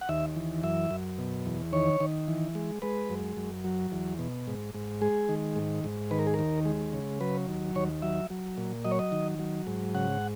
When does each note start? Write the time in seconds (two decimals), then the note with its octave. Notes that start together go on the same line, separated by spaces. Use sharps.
0.01 F#5
0.09 D#2 E5
0.36 E3
0.63 F#2 E5
0.91 F#2
1.18 B2
1.46 E2
1.73 D#3 C#5
2.00 D#3
2.28 E3
2.55 G#3
2.82 G#3 B4
3.10 F#2
3.37 F#2
3.64 F#3
3.92 E2
4.19 B2
4.47 G#2
4.74 G#2
5.01 G#3 G#4
5.29 D#3
5.56 G#2
5.84 G#2
6.11 D#3 B4
6.19 A#4
6.27 G#4
6.34 D#2 A#4
6.65 G#3
6.93 C#3
7.21 F#3 B4
7.48 D#2
7.75 D#2 C#5
8.02 F#3 E5
8.30 F#3
8.58 A#2
8.85 F#3 D#5
8.91 C#5
8.99 D#5
9.12 D#3
9.39 F#3
9.67 G#2
9.95 C#3 F#5